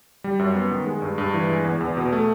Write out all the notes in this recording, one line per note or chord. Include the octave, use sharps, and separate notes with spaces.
G3
F#2
B3
D#3
G#3
G2
G2
E3
G#3
E2
E2
B2
A3